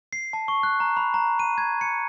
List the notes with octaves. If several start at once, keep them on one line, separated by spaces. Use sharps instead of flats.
C7
A5
C#6
F#6
A#5
B5
A#5
D#7
G#6
C#7